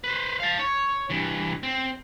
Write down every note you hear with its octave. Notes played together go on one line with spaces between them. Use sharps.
B4 C5
F5 A5
C#5
G2 E3
C4